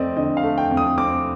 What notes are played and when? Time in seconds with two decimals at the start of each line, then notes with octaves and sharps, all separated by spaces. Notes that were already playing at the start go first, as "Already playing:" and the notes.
Already playing: F2 A3 C4 D5 D#5
0.17 D3 D#5
0.37 F5
0.43 A3
0.58 G5
0.71 F2
0.77 D#6
0.98 C4 D6